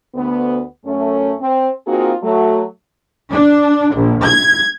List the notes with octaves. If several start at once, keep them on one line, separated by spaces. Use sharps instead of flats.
D2 B3
F#2 A3 C#4
C4
A#3 C4 D#4 F4 F#4 G#4
F#3 A3
D4
A#1
G#6